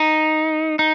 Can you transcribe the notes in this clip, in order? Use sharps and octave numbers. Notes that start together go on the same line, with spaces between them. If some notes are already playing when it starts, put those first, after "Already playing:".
Already playing: D#4
D#4